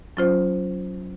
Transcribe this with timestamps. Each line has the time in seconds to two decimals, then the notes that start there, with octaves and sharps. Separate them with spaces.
0.17 F#3 C#4 F4 C5